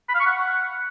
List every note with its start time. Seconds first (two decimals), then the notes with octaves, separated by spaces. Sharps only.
0.08 B5
0.14 F5
0.20 C#6
0.26 F#5